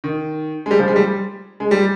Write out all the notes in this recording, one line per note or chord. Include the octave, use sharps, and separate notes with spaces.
D#3
G#3
G3
F3
G#3
G3
G#3
G3